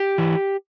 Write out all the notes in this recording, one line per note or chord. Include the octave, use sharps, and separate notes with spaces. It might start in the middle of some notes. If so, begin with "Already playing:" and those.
Already playing: G4
E3